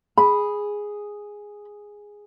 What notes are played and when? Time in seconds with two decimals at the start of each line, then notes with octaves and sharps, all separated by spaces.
0.17 G#4 B5